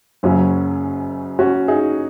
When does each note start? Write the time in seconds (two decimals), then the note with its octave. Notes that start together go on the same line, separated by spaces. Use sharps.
0.23 F#1 F#2 C#3 F#3 C#4
1.39 C#4 F#4
1.68 D#4 G#4